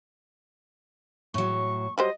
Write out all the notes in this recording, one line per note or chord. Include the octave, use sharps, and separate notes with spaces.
A2 F#3 C#6
F#3 G3 C5 D#5